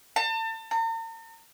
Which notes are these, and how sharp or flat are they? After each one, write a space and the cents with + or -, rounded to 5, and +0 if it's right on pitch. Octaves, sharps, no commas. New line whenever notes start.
A5 +35
A#5 -45